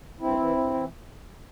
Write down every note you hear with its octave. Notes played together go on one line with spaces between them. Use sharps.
G2 C4 E4
E3
G2
E3